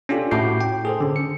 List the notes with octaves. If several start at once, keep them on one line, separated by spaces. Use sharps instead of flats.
C#4 D4 F4 G4 A4
A2 F#4 D6 G6 C7
G5
G#4 A4 C5
D3 C#4
C#7